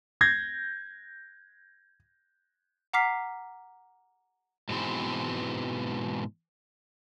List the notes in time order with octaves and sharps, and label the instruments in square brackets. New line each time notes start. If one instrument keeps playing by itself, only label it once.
[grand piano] G6 G#6 A#6 C7
[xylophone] F#5 A#5 D6 F6 B6 C7
[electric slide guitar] G#2 B2 E3 G#3 C4